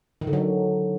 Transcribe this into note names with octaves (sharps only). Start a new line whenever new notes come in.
D#3
D3
F#3